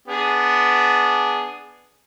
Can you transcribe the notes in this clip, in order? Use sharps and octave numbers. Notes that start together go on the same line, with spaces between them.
B3 D4 G#4